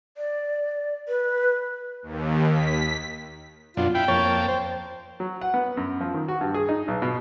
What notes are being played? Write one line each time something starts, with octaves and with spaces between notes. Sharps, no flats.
D5
B4
D#2
B6
F#2 B2 D4 F4
E4 F4 G5 B5
F2 A#3 C#5 A5
C5
F#3
F#5
B3
F#2
F3
D#3
F#4
G2
G#4
D#4
B1
B2